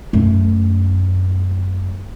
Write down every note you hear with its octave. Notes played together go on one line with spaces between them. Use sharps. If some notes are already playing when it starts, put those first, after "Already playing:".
F#2 A3